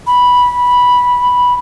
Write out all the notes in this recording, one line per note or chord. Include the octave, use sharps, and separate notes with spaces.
B5